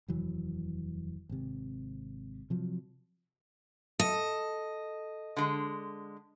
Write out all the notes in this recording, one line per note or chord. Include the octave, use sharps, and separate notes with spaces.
F1 D#2 E3 F#3
G#1 C3
C3 F3 F#3
A4 D#5
D3 G#3